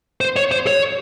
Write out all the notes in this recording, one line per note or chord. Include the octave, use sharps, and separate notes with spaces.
C5
C#5
C5
C#5